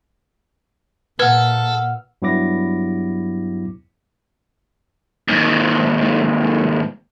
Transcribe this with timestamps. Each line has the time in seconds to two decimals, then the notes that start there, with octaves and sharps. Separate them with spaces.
1.19 A#2 A4 B4 F#5 E6 F6
2.22 G2 F#3 B3 E4 D6 A#6
5.28 D#2 G#2